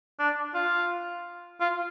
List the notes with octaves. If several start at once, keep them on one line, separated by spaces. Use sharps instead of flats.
D4
F4
F4